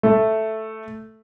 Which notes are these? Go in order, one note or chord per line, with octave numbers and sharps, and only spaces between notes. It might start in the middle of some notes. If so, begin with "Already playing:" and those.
A3